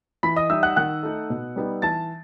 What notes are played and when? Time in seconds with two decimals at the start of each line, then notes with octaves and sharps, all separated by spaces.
0.23 E3 B5 B6
0.36 D#5 D#6
0.50 G3 D#4 E5 E6
0.63 F#5 F#6
0.76 D#3 F#5 F#6
1.03 A3 D#4
1.30 B2
1.56 G3 B3 D#4
1.82 E3 A5 A6